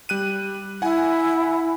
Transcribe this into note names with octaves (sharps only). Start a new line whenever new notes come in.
G3 F#6 D#7
E4 F#5 G#5